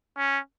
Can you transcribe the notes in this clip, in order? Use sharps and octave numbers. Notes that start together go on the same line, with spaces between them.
C#4